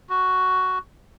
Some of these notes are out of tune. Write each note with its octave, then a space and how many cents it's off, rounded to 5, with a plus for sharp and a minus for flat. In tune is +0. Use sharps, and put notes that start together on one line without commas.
F#4 +5